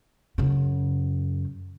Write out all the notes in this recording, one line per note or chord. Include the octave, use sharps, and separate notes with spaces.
F#2 C#3